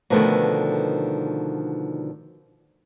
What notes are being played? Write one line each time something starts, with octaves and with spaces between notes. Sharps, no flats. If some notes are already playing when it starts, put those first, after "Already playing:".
B2 D3 D#3 F3 A3 B3